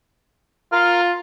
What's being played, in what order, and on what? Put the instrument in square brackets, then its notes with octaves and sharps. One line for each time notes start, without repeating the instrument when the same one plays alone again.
[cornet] F4 [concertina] A#4 F6